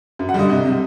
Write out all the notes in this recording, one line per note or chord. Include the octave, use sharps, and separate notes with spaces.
F#2
F#5
D3 G3 D#5
C2 D#5
C3 G3